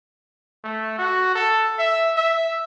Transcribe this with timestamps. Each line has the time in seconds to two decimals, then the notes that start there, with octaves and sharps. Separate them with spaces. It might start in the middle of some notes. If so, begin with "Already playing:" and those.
0.64 A3
0.98 F#4
1.35 A4
1.79 E5
2.16 E5